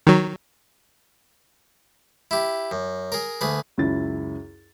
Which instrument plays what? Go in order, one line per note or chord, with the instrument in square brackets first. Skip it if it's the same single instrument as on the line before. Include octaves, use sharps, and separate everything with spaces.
[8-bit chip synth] D#3 F#3
[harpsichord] E4 G4
F#2
G#4 A#4
D2 G#4 B4
[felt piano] C#2 F#2 E4 A6